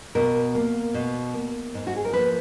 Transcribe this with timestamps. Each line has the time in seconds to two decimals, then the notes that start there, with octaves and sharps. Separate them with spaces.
0.15 B2 A#4
0.55 A#3
0.94 B2
1.34 A#3
1.74 G#2
1.87 F#4
1.96 G#4
2.05 A#4
2.13 F3 A#3 B4